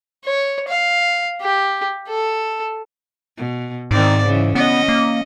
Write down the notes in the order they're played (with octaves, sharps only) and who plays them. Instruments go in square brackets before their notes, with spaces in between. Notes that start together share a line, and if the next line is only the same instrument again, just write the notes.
[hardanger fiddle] C#5
F5
G4
A4
[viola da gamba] B2
[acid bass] G#2 [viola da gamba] D#3 C4 D5
[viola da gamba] C#3 E3
[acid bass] B3 [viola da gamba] C#4 D#5
[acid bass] A#3